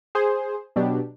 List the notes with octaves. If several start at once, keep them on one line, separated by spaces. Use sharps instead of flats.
G#4 C5
B2 F#3 D4 G4